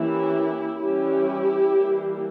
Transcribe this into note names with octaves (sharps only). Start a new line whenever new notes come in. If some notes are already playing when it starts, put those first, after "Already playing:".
Already playing: E3 A#3 C#4 E4 G4
E3 G3 C#4 E4 G4
E3 G3 A#3